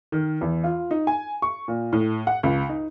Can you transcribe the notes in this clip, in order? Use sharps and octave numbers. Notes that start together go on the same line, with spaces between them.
D#3
E2
F4
D#4
G#5
C#6
A#2
A2
F#5
C#2
D#4